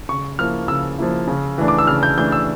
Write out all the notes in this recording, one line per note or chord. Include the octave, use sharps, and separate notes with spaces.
C#3 C#6
F3 A#3 E4 F6
C#3 E6
F3 A#3 E4
C#3
E3 A3 D4
D6
E6
C#3 F6
G6
E3 A3 D4 G6
E6